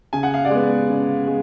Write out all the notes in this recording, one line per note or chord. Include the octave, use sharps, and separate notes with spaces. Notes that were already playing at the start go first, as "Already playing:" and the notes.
C#3 G#5
F#5
F5
D5 F#5
G#3 B3
C#3
G#3